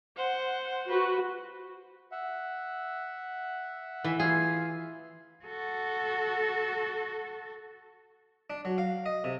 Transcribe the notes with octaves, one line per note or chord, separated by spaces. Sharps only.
C5 F#5
F#4 B4
E5 F#5
E3
F4 G#4 E5 F5
F#4 A4
D4
F#3
F5
D#5
C3